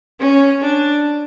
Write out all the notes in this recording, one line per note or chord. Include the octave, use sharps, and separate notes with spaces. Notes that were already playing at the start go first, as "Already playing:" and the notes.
C#4
D4